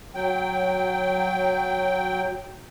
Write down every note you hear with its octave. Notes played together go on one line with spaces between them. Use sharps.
F#3 G5